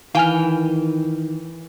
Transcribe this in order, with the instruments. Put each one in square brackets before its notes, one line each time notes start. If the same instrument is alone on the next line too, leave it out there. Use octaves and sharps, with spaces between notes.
[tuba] D#3 [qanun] E3 G5 [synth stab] F5 G#5 F6